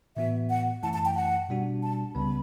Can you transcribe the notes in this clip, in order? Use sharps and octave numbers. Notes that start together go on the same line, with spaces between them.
A2 E3 B3 F#4 E5
F#5
F#2 E3 A3 E4 A5
A5
G5
F#5
B2 G3 D4 F#4
A5
C#2 C#3 G3 B3 B5